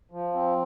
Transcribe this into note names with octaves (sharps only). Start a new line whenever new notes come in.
F3
C4